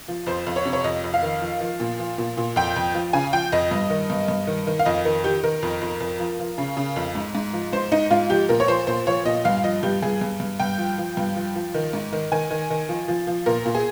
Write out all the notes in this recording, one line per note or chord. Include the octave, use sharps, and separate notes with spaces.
F3
F2 C5
F2
C#5
C3
C#5
F2 D#5
F2
F5
D#3
F3
F3
A#2
F3
A#2
A#2
F2 G5
F2
F3
C#3 G#5
F3 G5
F2 D#5
G2
D#3
G2
G2
D#3
D#3
F5
F2 D#5
D#3 A#4
D#3 G4
D#3 A#4
F2
F2
F2
F3
F3
C#3
C#3
F2
G#2
G#2
F3
G#2 C5
G#2 D#4
G#2 F4
F3 G4
A#2 A#4
C#5
F3 C5
A#2 C5
F3 C#5
A#2 D#5
G2 F5
F3 D#5
G2 G4
G2 G#4
G2
G2
G2 G5
F3
F3
G2
F3
F3
D#3
G#2
D#3
D#3 G#5
D#3
D#3
F3
F3
F3
A#2 A#4
A#2
G#4